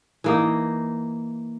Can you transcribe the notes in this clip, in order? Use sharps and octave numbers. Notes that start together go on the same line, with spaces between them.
E3 A#3 D#4